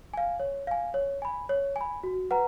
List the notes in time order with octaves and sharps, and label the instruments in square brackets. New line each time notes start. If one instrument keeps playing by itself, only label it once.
[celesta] F5 G#5
C#5
F5 G#5
C#5
G#5 B5
C#5
G#5
B5
F#4
B4 F#5 A#5